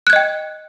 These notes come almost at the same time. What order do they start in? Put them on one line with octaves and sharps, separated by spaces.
F#6 G#6 D#5 G5